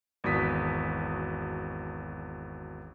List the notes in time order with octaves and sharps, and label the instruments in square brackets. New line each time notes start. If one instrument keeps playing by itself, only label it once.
[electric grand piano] G#1 E2 F#4 D#6 B6